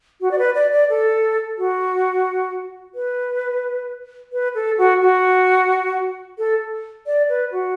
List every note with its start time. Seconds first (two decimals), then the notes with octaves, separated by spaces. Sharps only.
0.21 F#4
0.31 D5
0.39 B4
0.55 D5
0.73 D5
0.90 A4
1.58 F#4
2.95 B4
4.33 B4
4.55 A4
4.78 F#4
5.01 F#4
6.38 A4
7.06 D5
7.29 B4
7.52 F#4